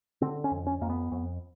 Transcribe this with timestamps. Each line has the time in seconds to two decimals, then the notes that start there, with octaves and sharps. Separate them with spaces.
0.22 D3 C4
0.44 C#4
0.51 F2
0.67 C#4
0.81 F2 A#3
0.90 B3
1.12 F2